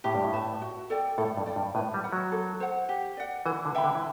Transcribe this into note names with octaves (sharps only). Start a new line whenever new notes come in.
A2 G4
G2
A2
B4 E5 A5
F#4
A4 D5 G5
A2 A4
G2
D5 G5
G2
A2 B4
G3
F#5 B5
F#3
A4
C5 F#5
G4
D5 F#5
E3 B4
D3
E5 G5 B5
D3
E3